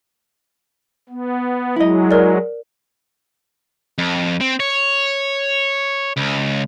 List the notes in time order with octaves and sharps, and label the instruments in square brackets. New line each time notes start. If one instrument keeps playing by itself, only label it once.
[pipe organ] B3
[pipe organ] F#3 G#3 [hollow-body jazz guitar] E4 D#5
[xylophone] A#4 D5
[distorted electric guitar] F2
C4
C#5
C#2